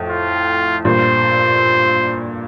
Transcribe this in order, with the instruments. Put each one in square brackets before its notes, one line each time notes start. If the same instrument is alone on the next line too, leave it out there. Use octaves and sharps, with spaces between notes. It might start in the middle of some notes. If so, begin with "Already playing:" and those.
Already playing: [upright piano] F2 A2
[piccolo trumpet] F4
[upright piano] G2 A#2 [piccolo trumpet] C5